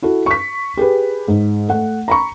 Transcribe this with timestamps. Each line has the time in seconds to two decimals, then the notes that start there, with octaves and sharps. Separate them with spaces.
0.02 E4 F#4 A4
0.26 C#6 B6
0.77 G4 G#4 B4
1.28 G#2
1.69 A3 F#5
2.08 A#5 B5 C#6